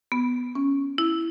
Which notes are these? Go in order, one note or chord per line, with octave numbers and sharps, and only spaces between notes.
B3
C#4
E4